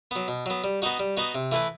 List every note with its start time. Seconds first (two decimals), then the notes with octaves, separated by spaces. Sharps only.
0.11 F#3 B3
0.28 B2
0.46 F#3 B3
0.64 G3
0.82 B3 D#4 F#4
0.99 G3
1.17 B3 D#4 F#4
1.35 C3
1.52 E3 A3 E4 B4